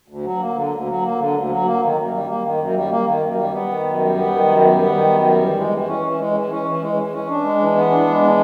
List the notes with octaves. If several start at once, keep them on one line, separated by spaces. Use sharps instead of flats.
D2
F#3
A#3
D3
D2
F#3
A#3
D3
D2
F#3
A#3
D#3
F#2
G3
A#3
D#3
F#2
G3
A#3
D#3
F#2
G3
B3
D#3
F#2
G3
B3
D#3
F#2
G3
B3
D#3
F#2
G3
E3
G#3
E3
C#4
E3
G#3
E3
C#4
E3
G#3
E3
C#4
D4
G#3
E3
B3
D4
G#3
E3